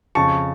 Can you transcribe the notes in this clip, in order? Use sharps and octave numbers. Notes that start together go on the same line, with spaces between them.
F2 C#3 A5 C#6